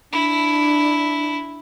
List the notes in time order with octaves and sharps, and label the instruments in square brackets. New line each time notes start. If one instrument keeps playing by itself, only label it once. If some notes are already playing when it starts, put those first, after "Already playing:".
[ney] D4 [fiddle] E4